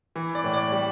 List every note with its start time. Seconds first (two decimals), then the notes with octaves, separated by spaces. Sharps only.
0.16 E3
0.35 D5
0.44 A2
0.53 D5
0.72 G3